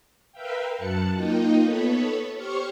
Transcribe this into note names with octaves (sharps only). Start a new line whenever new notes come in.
A#4 B4 E5 F5 G5
F#2 A5 F#6 C#7
A#3 D#4 F4 D#5 G5
B3 A4 B4 C#5
G4 C5 C#5 C#6 F6